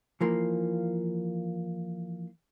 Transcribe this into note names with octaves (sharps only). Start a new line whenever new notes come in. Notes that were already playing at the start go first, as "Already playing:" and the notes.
E3 F3 A#3